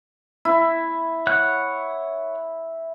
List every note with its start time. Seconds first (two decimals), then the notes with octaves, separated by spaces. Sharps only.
0.45 E4
1.27 C#5 F#5 F#6